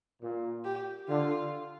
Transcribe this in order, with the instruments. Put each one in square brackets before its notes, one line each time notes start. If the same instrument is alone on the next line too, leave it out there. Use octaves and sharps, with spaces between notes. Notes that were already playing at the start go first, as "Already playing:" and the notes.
[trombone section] A#2
[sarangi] G4
[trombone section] D3 [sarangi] F4